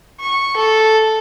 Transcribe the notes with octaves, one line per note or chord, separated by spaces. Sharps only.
C#6
A4